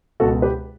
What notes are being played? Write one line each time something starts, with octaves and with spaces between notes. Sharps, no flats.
C#2 B2 F#4 A4
G4 B4